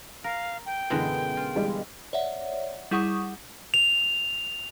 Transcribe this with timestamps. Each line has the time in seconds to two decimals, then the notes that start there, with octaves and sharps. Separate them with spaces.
0.24 A#4 F5
0.66 G5
0.90 F#2 B2 D3 E3 G#3
1.37 F4
1.55 E3 G3 G#3
2.13 C#5 D5 E5 F#5
2.91 G3 E4 G#4 F#5 C#6 D#6
3.74 F7